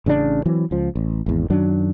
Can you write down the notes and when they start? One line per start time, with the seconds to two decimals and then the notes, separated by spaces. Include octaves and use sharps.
0.06 A1 C#3 C#4 D4
0.46 E3 F#3 C4
0.71 C#2 F3
0.95 A1
1.26 G#1 E2
1.50 F#2 D#3 F#3 D4